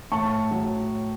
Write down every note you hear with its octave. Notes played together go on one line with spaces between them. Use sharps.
A2 A5 C#6
F#3